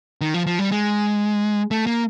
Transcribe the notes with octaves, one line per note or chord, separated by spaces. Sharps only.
D#3
F3
F3
G3
G#3
A3
A#3